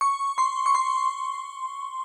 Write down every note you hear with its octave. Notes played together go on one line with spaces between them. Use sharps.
C#6
C6
C#6
C6